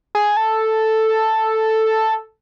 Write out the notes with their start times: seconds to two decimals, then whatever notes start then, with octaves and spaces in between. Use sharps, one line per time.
0.15 G#4
0.37 A4